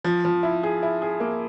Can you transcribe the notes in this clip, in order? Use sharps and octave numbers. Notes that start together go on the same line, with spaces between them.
F3
F3
E4
G#4
E4
G#4
A#3